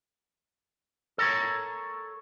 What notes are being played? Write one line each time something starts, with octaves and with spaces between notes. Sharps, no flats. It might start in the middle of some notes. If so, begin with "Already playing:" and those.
A4 A#4 C#5